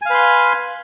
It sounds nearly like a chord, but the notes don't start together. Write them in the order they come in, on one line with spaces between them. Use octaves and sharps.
G#5 F5 B4 C6